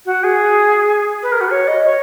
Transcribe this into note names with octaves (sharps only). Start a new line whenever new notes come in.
F#4
G#4
B4
A#4
F#4
C#5
D#5
C#5